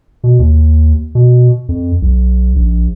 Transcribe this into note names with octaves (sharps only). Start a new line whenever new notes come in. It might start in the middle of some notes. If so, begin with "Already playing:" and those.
B2
D#2
B2
F2
B1
A#1